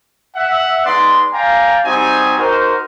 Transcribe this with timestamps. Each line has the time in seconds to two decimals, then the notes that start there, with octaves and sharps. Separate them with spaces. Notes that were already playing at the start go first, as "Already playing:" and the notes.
0.36 E5 F#5
0.86 G#3 B3 D#4 D5 C6
1.32 D5 F5 G5 G#5 A#5
1.85 G3 C4 D#4 F#4 G4 G#5
2.38 D#4 F#4 A#4 C5